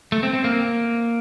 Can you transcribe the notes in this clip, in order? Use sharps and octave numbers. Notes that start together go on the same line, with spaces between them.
A3
C4
C4
A#3